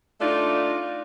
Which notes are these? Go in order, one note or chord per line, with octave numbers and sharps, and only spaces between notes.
A3 D4 D#4 F4